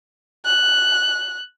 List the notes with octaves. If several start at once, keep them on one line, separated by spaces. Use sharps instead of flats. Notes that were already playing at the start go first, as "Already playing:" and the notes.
F#6